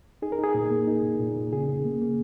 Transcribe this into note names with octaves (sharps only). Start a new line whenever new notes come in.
D#4 G#4
A#4
D#4 G#4
A#2
A#3
D#4
A#2
A#2
A#2
C#3 G#4
C#3
A#3
A#3